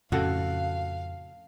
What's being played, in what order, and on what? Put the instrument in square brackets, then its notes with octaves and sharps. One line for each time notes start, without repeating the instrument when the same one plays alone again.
[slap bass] F2 A2 [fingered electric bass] C#3 [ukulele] F#4 A4 [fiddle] F5